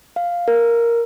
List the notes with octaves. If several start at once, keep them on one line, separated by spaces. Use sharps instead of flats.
F5
A#4